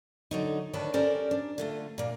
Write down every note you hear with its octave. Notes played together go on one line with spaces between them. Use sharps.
D3 F#3 D#4
D2 D#3 D4 B4 C#5 A5
C#4 G4 A4 A#4 C5 D5
D4
D3 A3 F4
A#2 A#3